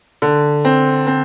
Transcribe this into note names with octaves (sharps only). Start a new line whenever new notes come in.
D3
C4
C4